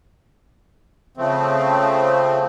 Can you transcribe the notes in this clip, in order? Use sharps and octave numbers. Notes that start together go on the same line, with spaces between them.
C#3 F3 A3 C4